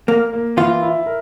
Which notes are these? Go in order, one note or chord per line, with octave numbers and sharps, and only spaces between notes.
A#3 A#4
A#3
E3 F4
E4
A#4